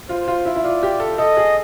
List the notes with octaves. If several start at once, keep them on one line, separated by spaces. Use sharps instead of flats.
F4 C5
F4
E4
E4
F4 D5
G4
A4
A4 D#5
G#4